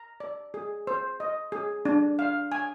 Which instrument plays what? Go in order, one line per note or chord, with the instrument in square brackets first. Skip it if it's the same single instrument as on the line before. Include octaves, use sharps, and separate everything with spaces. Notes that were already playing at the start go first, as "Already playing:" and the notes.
Already playing: [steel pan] A#5
D5
G#4
C5
D#5
G#4
D4
F5
G#5